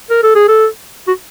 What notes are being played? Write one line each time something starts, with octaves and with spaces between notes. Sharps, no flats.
A#4
A4
G#4
A4
F#4